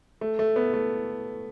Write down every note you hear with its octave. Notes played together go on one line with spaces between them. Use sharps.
A3
A3
B3
A3